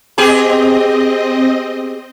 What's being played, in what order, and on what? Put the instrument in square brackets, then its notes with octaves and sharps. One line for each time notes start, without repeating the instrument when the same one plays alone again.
[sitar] B3 G4 G#4 [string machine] C4 D#5